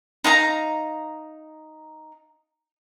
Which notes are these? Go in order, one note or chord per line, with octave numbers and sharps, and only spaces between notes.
D#4 F5 A#5